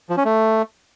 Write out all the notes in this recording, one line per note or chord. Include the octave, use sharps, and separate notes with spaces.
F3
C#4
A3